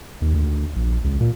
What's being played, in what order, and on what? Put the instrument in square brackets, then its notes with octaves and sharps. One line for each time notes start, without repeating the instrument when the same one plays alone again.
[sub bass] D#2
D2
A#1
C#2
A#2